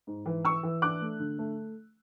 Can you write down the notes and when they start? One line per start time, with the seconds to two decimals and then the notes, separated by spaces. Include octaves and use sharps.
0.07 G#2
0.26 E3
0.44 E3 C#6 E6
0.63 E3
0.82 D4 D6 F#6
1.01 A3
1.20 D3
1.39 A3